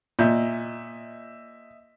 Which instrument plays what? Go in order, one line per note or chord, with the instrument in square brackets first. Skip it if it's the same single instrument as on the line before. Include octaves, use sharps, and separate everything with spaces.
[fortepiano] A#2 [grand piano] D#5 E5 G6